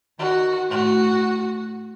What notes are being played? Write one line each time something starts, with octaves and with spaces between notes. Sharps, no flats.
D#3 F#4
A2 F#4